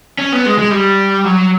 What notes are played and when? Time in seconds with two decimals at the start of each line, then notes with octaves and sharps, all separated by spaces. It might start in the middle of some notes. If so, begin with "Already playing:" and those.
0.19 C#4
0.32 B3
0.46 G#3
0.58 G#3
0.71 G3
1.25 F#3